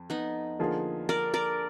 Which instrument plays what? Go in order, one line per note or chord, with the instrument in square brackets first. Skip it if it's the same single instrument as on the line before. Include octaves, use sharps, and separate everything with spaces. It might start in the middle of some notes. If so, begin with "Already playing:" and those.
Already playing: [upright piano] F2
[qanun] B3 D#4
[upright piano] D3 F3 A#3 F4 G#4
[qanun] A#4 D5
A#4 D5